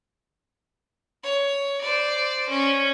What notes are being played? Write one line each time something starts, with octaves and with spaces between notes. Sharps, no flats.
C#5
C5 D5
C#4